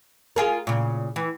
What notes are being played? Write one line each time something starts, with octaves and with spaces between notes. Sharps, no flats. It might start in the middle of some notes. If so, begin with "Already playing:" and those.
F4 G#4 A#4
A#2 C#3
E3